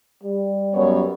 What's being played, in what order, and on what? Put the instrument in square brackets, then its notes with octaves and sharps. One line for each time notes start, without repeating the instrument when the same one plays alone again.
[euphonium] G3
[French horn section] F#2 B3 C#5